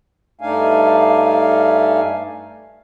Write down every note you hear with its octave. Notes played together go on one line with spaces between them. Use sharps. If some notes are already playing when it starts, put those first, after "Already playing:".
G2 A3 D4 D#4 F5 G#5